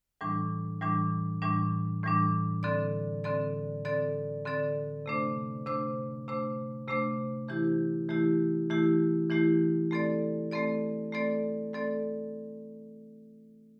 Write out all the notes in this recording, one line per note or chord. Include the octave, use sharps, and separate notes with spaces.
A2 E3 G3 D4
A2 E3 G3 D4
A2 E3 G3 D4
A2 E3 G3 D4
D3 C4 A4 D5
D3 C4 A4 D5
D3 C4 A4 D5
D3 C4 A4 D5
C3 A3 D4 C5
C3 A3 D4 C5
C3 A3 D4 C5
C3 A3 D4 C5
E3 A3 E4 G4
E3 A3 E4 G4
E3 A3 E4 G4
E3 A3 E4 G4
A3 C4 A4 D5
A3 C4 A4 D5
A3 C4 A4 D5
A3 C4 A4 D5